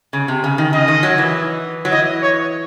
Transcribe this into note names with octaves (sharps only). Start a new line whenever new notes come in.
C#3
C3
C#3
D#3
C#3 D#5
D#3
F#3
E3
F#3
E3 D#5
C#5